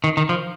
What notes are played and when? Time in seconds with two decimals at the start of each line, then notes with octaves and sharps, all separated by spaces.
0.04 D#3
0.17 D#3
0.29 F3